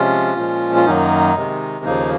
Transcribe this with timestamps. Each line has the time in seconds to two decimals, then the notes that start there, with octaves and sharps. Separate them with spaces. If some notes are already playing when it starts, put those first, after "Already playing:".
Already playing: C3 F3 G#3 C#4 F4
0.37 A#2 F3 G#3
0.76 F4
0.86 F#2 D#3 F#3 A#3 D#4
1.36 C3 D#3 G#3
1.85 D#2 C#3 F3 A#3 D#4